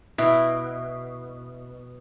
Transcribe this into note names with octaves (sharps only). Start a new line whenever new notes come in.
B2 E4